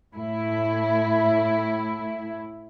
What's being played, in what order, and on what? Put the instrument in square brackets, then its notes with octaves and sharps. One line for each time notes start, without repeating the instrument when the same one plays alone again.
[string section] A2 E4